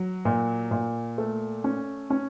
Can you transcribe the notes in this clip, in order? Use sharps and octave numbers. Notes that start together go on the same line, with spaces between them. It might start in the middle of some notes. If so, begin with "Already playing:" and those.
Already playing: F#3
A#2
A#2
A3
C#4
C#4